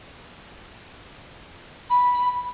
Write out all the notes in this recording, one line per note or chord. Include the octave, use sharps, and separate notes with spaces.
B5